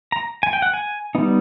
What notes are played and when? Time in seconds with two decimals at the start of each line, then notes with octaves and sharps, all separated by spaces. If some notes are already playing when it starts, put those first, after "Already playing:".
0.12 A#5
0.43 G#5
0.53 G5
0.62 F#5
0.74 G#5
1.15 G3 B3 D#4